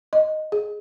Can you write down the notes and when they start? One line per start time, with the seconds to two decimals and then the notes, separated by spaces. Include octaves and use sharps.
0.13 D#5
0.52 G#4